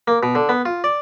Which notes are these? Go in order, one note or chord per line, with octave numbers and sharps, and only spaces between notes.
A#3
B2
D3
B3
F4
D5